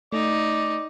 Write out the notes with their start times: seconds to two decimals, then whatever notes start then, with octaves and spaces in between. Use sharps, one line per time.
0.13 A3 D#4 D5